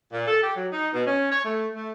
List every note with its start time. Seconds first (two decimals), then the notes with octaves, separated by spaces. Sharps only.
0.12 A#2
0.25 A4
0.42 G4
0.56 F#3
0.72 D#4
0.93 B2
1.05 C#4
1.31 C#5
1.44 A3
1.74 A3